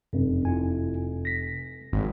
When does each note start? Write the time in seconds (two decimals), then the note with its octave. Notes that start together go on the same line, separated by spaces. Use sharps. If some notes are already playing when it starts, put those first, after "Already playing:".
0.13 F1 F#2
0.45 E4 F4 G#5
1.25 A#6 B6
1.93 G#1